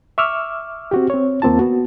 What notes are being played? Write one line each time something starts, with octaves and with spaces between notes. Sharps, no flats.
E5 C#6 D6 E6 F6
C4 F#4 G4
C4 C#5
D#2 A#3 C4 F4 A5
B3 F#4